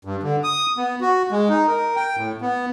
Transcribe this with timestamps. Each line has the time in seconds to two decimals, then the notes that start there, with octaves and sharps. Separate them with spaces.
0.05 G2
0.23 D3
0.44 D#6
0.77 B3
1.01 F#4
1.32 G#3
1.49 D#4
1.68 A#4
1.96 G5
2.17 A2
2.41 B3